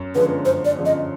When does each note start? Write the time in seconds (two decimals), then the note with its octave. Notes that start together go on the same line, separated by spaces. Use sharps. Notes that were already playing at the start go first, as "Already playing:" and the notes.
Already playing: F#2
0.15 D3 F3 G#3 C#4 B4
0.45 F#2 C5
0.65 D5
0.76 D3 F3 G#3 C#4
0.86 D#5